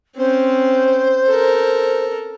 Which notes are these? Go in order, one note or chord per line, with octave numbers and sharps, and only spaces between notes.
C4 C#4 C5
A4 A#4